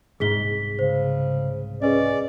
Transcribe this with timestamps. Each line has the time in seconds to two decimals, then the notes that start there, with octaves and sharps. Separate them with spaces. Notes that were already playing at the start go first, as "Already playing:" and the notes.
0.20 C2 G#2 G#4 B6 G7
0.79 C#3 C5
1.82 C#4 G#4 B4 D5 D#5